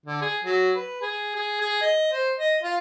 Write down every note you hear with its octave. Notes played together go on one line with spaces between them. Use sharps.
D3
G#4
F#3
B4
G#4
G#4
G#4
D#5
C5
D#5
F4